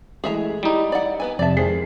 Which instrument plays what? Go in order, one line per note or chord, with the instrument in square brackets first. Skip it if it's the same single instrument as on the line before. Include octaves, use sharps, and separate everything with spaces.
[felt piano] E3 G#3 A3 [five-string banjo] G#4 E5 A#5
[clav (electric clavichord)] G3 D#4 [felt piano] E4
[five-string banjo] D5 F#5
B3 B4 G#5
[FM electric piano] F2 C3 A5 [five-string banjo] D5 E5
[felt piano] F1 D#3 C7 [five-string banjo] G#3 [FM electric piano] C4 G#4